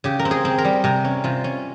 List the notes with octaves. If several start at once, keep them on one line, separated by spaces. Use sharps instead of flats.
C#3 G4
A#4
C4
G#4
C4
A#4
G3
C3 A#4
C#4
C3 F4
C#4